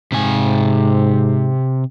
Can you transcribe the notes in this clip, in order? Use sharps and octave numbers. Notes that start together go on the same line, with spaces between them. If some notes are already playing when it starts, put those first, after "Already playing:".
G#2 C3 G#5